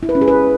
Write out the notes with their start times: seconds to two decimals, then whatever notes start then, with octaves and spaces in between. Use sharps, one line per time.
0.03 E4
0.09 B4
0.15 C#4
0.21 G#4
0.28 B4